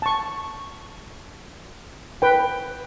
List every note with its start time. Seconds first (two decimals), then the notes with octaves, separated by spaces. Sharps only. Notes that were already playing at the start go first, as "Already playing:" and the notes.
0.02 A5 C#6
2.22 B4 G5